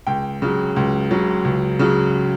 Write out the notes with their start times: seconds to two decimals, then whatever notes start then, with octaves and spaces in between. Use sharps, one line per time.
0.07 C#2 G5
0.42 C#3 F#3
0.76 C#2
1.11 C#3 F#3
1.45 C#2
1.79 C#3 F#3